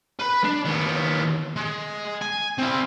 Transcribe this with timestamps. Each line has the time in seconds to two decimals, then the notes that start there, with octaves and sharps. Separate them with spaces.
0.19 B4 B5
0.44 D4
0.65 D#2 B3
1.57 G#3
2.21 G#5
2.58 C4 E4